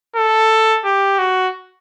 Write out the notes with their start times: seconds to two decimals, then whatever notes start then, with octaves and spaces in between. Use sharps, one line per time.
0.16 A4
0.85 G4
1.19 F#4